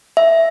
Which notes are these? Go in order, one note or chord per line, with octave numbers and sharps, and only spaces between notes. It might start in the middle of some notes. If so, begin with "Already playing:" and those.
E5